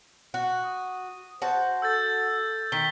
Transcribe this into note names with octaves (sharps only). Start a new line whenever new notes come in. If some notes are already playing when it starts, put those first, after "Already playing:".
F#4
D#6
F#4 C5 A5
A4 E6 G6 A6
D#3 B6 G7